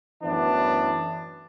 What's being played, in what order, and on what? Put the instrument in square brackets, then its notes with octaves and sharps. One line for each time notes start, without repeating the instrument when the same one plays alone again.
[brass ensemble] F#2 A2 E3 B3 D4